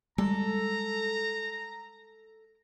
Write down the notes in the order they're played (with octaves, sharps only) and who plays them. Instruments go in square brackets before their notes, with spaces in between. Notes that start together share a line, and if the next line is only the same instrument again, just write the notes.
[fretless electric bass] G3 G#3 [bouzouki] A4 [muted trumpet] A#5